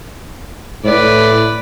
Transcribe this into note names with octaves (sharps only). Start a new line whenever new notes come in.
A2 B4 D5